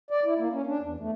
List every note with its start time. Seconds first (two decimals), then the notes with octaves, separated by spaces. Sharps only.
0.10 D5
0.25 E4
0.39 A#3
0.53 C#4
0.66 D4
0.82 E2
1.00 A3